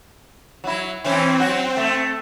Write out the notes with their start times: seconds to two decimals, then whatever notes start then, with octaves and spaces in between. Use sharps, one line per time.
0.64 F#3 E4
1.04 E3 C4 C#4
1.40 F#3 F#4
1.77 A3